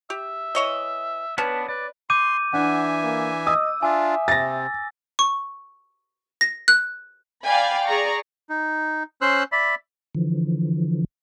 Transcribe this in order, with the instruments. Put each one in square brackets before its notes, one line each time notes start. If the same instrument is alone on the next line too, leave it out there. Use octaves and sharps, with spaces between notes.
[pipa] G4 [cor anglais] E5
[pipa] E3 C#5 D#5
[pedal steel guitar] B3 B4 A5 [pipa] C#4 [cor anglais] D4
[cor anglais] B4 [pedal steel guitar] D5
[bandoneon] C6 [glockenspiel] D6 G6 D#7
[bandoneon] E3 E5 G#5 [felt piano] D4 [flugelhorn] F#5
[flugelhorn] A#3
[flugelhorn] D#5 [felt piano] D#6 [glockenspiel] E6
[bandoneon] D4 F4 [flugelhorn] E5 [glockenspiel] G#5
[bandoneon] C3 [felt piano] A6 A#6
[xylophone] C#6
A#6
F#6
[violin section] D5 F5 G5 G#5 B5
G#4 D5 A#5 C#6
[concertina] D#4
C#4 C5 C6 E6 F#6
D5 E5 B5
[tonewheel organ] D3 E3 F3